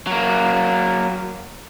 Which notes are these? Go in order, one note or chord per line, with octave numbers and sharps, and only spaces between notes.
F#3 A#3